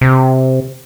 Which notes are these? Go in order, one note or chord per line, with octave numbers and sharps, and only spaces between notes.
C3